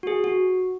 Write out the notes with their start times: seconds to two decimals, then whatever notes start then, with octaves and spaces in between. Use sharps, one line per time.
0.03 F#4
0.07 G#4
0.24 F#4